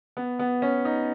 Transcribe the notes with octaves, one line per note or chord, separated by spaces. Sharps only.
B3
B3
C#4
D#4